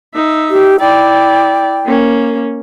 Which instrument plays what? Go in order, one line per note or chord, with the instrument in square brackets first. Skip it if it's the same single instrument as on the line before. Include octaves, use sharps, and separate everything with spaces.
[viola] D#4 E5
[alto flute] G4
[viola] E4 D5 [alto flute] G5
[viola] A#3 C#4